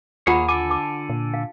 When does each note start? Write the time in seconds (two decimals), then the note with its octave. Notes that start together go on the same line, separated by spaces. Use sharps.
0.27 D#2 A#3 F4 G#4 C#5 F#5 B5
0.48 D3 A4 G#5 D6
0.70 A5 D6
1.09 A#2
1.34 F5